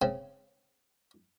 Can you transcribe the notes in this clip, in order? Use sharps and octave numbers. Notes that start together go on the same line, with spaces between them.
C#3 C4